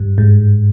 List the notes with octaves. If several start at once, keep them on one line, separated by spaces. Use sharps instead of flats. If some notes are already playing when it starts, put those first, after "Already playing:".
Already playing: G2
G#2